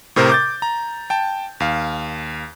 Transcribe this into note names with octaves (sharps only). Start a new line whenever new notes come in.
A2 C3 A#4 C5
D6 G6 A6
A#5
G5 A5
D#2 F5